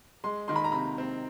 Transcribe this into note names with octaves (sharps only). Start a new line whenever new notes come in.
G#3 C6
D#3 C6
B5
A#5
C3 B5
C4